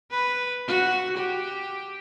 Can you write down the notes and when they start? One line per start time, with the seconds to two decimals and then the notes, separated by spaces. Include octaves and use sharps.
0.11 B4
0.68 F#4
1.17 G4